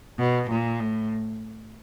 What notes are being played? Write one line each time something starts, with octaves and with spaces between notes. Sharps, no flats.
B2
A#2
A2